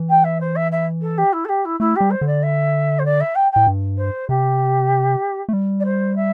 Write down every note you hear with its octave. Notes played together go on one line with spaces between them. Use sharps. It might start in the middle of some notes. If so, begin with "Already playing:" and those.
Already playing: E3
G5
E5
C5
E5
E5
A4
G4
E4
A4
G4
E4
A3 E4
G3 G4
C5
D3
D5
E5
C5
D5
E5
G5
A2 G5
G2
C5
C3 G4
A3
G3
D5
C5
E5